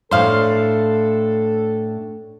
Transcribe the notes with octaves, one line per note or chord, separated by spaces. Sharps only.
A2 D4 A4 C5 F5